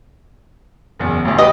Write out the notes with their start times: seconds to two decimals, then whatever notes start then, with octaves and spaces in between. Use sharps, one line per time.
0.99 F#1 E2
1.25 A1 D2
1.38 G4 B4 D#5